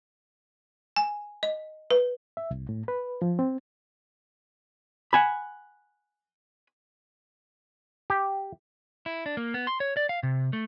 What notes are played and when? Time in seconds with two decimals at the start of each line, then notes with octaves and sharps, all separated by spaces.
0.96 G#5
1.43 D#5
1.91 B4
2.37 E5
2.51 C2
2.69 A2
2.88 B4
3.22 F3
3.39 C4
5.13 F#5 G#5 B5
8.10 G4
9.06 E4
9.26 D4
9.37 A#3
9.54 B3
9.67 C6
9.80 C#5
9.97 D5
10.09 F5
10.23 C3
10.53 A3